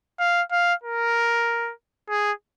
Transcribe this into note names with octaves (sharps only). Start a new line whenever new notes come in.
F5
F5
A#4
G#4